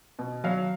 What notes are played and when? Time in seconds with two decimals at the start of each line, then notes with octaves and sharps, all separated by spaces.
0.19 B2
0.44 F#3 F5